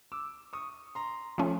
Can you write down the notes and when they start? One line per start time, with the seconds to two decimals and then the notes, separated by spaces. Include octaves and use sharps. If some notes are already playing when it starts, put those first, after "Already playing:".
0.12 D6 E6
0.53 C#6 D#6
0.95 A#5 C6
1.38 F3 A3 C#4